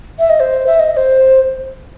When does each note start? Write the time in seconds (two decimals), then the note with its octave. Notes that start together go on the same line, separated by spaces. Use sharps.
0.19 E5
0.30 D#5
0.40 C5
0.67 E5
0.80 D#5
0.93 D#5
0.97 C5